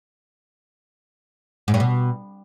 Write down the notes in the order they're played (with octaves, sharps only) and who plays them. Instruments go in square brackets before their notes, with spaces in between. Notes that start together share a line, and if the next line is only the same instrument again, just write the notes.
[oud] G#2
G2
B2